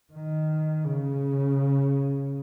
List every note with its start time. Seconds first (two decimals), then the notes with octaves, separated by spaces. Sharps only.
0.13 D#3
0.85 C#3